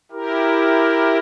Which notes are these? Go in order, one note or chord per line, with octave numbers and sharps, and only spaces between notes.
E4 G4 A#4